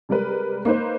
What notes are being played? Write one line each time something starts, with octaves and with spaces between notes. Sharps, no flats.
C3 G3 G#3 A#4 B4
A#3 D#4 B4 C5